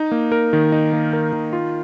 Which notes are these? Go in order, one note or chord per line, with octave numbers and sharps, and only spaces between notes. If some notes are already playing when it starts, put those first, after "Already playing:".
Already playing: D#4
A#3
A#4
D#3
D#4
A#3
A#4
D#3
F4